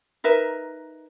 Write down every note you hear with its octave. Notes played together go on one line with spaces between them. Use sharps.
D#4 A#4 B4 E5